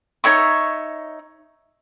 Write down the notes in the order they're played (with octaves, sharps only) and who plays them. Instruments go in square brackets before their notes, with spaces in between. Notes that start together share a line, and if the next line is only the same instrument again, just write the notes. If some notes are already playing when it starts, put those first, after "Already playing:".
[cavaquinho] D#4 C#5 E5 C#6